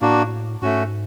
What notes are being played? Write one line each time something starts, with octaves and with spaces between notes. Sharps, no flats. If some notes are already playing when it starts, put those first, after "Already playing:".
A2 A#3 D4 F#4
G#2 A3 C#4 F#4